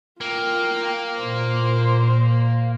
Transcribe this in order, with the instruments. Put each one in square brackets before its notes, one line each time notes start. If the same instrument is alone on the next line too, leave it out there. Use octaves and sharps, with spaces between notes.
[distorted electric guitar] A#3 [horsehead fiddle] F4 G5
[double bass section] A#2 [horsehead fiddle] C5